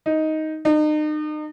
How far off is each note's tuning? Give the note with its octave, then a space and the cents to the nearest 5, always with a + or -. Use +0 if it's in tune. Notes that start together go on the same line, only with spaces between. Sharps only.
D#4 +10
D#4 -35